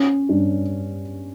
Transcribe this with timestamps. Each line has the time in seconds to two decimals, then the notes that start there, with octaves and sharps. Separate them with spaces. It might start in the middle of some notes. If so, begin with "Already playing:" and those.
Already playing: C#4
0.29 G2